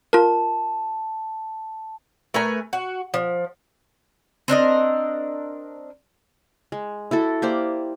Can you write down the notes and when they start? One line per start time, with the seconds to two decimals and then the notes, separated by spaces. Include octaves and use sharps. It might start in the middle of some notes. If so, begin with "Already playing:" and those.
0.13 F4 A#4 A5
2.34 A3 A#4 B4 G#5
2.73 F#4
3.14 F3
4.48 C4 D4 A#4 D#5
6.72 G#3
7.11 E4 F#4 A4
7.42 A#3 G4 C5 D5